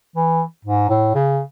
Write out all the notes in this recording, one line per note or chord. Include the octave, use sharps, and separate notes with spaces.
E3
G#2
A2
C#3